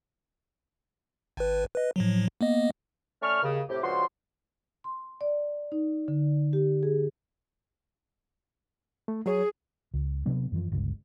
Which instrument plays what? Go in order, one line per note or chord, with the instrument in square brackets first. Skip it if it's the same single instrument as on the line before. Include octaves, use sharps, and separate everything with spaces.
[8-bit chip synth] G#1 B4
B4 D#5
A2 F3 F#3
A#3 B3 D#5
[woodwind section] A3 C#4 D5 C#6 F6
D#2 C#3
A2 C3 G4
C#2 G2 F3 F#4 C6
[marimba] C6
D5
D#4
D3
G4
G#4
[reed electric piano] A3
[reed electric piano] F#3 C#5 [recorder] G#4
[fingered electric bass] C#2
C3 F#3 B3 D4
F#2 E3 F3
G1 C#2